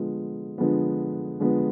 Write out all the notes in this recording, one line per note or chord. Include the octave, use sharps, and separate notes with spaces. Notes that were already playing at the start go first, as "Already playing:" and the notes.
Already playing: D3 F3 G#3 B3
D3 F3 G#3 B3
D3 F3 G#3 B3